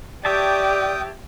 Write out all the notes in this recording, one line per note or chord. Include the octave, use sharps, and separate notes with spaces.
G4 C#5 D5 E5 G5 A5 D#6